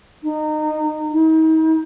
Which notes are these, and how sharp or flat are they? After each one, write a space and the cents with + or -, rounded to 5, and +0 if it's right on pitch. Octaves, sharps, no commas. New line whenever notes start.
D#4 -25
D#4 +40